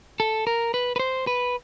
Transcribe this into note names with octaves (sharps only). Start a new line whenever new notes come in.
A4
A#4
B4
B4
C5
B4